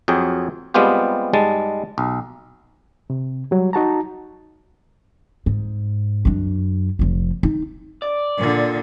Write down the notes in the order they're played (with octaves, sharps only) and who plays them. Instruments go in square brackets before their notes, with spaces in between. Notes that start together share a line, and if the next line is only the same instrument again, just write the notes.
[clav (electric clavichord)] F2 F#3 G#4 G5
G3 G#3 B3 C4 F4 G4
G#2 G3 G#3 A5
B1
[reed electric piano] C3
F#3 G3
D#4 F#4 A5 A#5
[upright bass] G#2
F#2 D4
F1 F3
D#4
[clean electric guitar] D5
[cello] A#2 D3